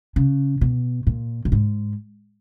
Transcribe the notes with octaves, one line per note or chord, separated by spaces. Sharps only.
C#3
B2
A#2
A#2
G#2